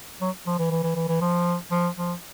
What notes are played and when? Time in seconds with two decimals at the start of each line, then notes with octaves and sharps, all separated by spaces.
0.21 F#3
0.46 F3
0.59 E3
0.71 E3
0.83 E3
0.95 E3
1.08 E3
1.21 F3
1.71 F3
1.96 F3